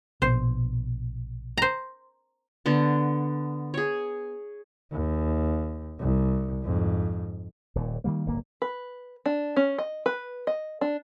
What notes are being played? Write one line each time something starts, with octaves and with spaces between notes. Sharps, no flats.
A#1 B2 C5
C5 A#5
D3 B3
G#4 C#5
D#2
C2
F2 G#2
D#1 D#2 A#2
D#3 F3 G3 A#3
D1 G1 A#2 A#3
B4
D4
C#4
D#5
B4
D#5
D4